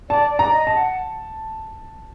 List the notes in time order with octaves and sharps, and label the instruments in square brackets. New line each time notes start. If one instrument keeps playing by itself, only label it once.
[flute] D5 [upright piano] A5
[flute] D5
[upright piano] A#5
[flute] D#5
[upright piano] A5
[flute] F#5